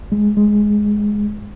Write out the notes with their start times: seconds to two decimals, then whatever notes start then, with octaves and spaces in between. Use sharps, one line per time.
0.12 G#3
0.37 G#3